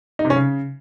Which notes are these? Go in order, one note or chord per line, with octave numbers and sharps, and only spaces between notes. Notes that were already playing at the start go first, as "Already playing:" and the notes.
D#4
C3
C#4
C#3